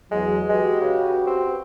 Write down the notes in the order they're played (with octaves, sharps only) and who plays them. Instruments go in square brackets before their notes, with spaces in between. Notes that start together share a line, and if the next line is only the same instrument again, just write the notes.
[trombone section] E2 F#3 [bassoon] G#3
[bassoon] G#3 [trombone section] F#4 G4 B4
[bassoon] C#3
C4